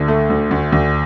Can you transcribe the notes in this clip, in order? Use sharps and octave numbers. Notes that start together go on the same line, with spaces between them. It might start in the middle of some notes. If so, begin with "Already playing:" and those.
Already playing: D2 D3
A3
D2
D2
D2